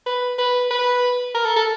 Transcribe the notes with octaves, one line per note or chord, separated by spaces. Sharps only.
B4
B4
B4
A#4
A4
A4